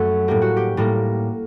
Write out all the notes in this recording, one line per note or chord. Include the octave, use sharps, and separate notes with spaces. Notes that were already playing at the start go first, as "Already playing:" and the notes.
Already playing: F#2 F#3 A3 A4
A2 G3 A#3 G4
F#4
G4
A2 G3 A#3